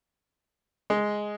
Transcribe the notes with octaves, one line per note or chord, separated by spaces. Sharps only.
G#3